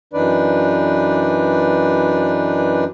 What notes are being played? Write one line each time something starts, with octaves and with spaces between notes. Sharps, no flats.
F#2 E3 D4 D#4 B4 D5